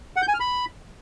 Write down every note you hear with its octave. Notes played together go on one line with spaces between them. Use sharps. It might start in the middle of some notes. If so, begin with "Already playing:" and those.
F#5
G6
G#5
F6
B5